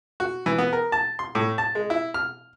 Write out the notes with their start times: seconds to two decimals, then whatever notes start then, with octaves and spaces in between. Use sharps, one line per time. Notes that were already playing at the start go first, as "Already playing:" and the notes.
0.20 F#4
0.46 E3
0.58 B3
0.73 A#4
0.92 A5
1.19 C6
1.35 A2
1.58 A5
1.75 G#3
1.90 E4
2.14 F6